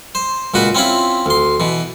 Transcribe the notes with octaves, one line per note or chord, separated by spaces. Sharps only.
C5
C#2 A#2 F#4 B4
C4 C#4 E4 F4 B5
D2 C6
B2 E3